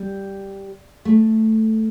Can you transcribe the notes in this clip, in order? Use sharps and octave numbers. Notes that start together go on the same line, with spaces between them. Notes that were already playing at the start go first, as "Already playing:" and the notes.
Already playing: G3
A3